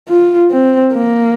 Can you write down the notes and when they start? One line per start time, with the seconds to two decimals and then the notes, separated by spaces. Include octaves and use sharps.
0.09 F4
0.51 C4
0.93 A#3